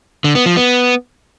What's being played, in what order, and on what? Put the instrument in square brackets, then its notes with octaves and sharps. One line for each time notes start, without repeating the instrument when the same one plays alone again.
[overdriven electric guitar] D3
B3
F3
B3